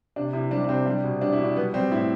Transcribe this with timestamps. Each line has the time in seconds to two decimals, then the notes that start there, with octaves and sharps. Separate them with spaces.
0.16 C3 D4
0.33 C3 E4
0.51 G3 D4
0.64 D4
0.69 C3 C4
0.86 G3 D4
1.04 B2
1.21 G3 D4
1.32 E4
1.38 B2
1.44 D4
1.56 G3 B3
1.74 G3 C4
1.91 A2 E4